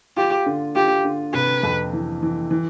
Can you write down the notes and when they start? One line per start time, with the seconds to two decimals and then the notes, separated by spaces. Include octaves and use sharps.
0.17 F4 G4
0.46 D3
0.76 F4 G4
1.04 D3
1.34 C3 B4
1.63 F2
1.93 E3
2.23 E3
2.51 E3